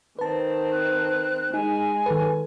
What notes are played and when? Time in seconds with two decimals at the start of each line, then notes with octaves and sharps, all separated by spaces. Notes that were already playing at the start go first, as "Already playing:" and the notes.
0.19 D#3 C4 B4 A5
0.73 F#6
1.54 G#3 D#4 G#5
2.06 D#3 A4 B4